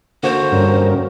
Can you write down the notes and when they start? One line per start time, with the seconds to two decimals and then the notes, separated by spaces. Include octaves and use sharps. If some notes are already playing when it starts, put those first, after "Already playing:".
0.23 D3 A#3 F#4 C5
0.52 G2 C#4 A#4